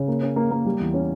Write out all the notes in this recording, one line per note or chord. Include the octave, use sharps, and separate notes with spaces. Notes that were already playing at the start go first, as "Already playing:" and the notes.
Already playing: C#3
A#3
C#4
A#3
A#3
G3
E2
C#4